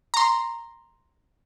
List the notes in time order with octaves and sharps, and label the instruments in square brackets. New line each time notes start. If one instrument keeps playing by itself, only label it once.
[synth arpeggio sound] A#5 C6